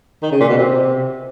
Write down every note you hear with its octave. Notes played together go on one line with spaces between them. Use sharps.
D#3
C#3
A#2
B2
C3